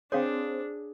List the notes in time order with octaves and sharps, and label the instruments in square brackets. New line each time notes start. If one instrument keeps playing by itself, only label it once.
[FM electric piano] C4 C5 [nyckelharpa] D4 [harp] G#4 [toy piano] C#5 F5 G5